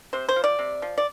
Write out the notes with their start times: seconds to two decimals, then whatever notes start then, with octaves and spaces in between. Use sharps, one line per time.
0.13 C3 C5
0.29 C5
0.36 F3
0.44 D5
0.59 C3
0.82 F3
0.98 D5